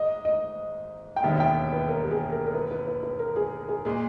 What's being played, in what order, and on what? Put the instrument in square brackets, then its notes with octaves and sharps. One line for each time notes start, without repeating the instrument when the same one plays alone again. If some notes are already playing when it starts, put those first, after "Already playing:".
Already playing: [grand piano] G#1 G#2 [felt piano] D#5
[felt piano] D#5
G5
[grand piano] E1 D#2 D#3 G3 B3 [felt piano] E5
[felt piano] E5
G5
B4
A#4
G4
G#4
A#4
A#4
B4
B4
B4
B4
A#4
G#4
G#4
[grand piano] A#2 G#3 [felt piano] G#4